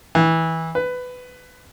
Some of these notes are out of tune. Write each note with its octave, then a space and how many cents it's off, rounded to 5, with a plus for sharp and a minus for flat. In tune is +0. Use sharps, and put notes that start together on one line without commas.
E3 -20
B4 +15